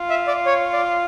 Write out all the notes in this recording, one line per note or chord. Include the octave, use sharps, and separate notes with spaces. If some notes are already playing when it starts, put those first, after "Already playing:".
Already playing: F4
E5
D5
C#5
D5